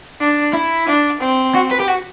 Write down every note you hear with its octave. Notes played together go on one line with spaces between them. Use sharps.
D4
E4
D4
C4
F#4
B4
G4
F#4